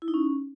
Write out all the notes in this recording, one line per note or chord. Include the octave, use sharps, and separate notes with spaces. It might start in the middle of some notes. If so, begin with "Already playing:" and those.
E4
D#4
C#4